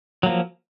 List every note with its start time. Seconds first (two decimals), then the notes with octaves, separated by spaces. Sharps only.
0.23 F#3
0.26 A#3
0.29 F3